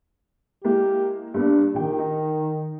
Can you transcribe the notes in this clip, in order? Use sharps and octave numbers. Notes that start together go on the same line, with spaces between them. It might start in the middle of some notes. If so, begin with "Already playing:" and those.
G#3 A#3 E4 G4
G2 A#3 B3 D4
A#1 D#3 G4 G5
D#4